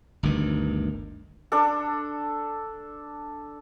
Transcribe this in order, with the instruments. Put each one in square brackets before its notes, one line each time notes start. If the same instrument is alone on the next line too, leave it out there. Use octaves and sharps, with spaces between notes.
[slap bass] G1 D2 G2 D#3
[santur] D4 A4